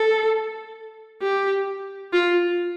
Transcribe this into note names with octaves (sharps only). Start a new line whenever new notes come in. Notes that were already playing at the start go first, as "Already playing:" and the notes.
Already playing: A4
G4
F4